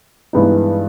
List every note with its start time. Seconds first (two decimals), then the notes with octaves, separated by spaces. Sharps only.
0.33 G2 E3 G#3 B3 D#4